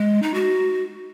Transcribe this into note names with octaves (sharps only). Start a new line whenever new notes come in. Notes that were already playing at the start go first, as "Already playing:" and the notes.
Already playing: G#3
D#4
F#4